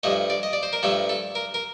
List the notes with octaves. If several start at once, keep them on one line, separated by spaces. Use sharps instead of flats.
G2 F3 A3 D#5
D5
D#5
D5
C5
A#4
G2 F3 A3 A4
A4
A#4
A#4